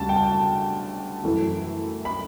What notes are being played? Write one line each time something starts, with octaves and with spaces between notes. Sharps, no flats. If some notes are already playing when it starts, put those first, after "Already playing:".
Already playing: D2 C#3 G3 A5
G5
A5
F#2 E3 A3 E4
B5